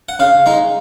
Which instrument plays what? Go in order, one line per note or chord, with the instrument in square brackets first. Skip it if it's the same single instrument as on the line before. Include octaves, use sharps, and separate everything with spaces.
[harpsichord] F#5
C#3 F5
G#3 D#4